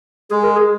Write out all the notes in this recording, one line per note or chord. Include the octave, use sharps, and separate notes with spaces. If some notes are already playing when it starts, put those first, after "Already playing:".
G#3 G#4
A#4
G#4